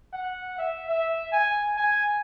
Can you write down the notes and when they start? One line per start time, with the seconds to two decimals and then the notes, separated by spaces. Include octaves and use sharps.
0.13 F#5
0.58 E5
0.88 E5
1.33 G#5
1.77 G#5